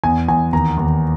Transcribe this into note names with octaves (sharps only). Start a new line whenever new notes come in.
E2 G#5
E2 G#5
D#2 A#5
D#2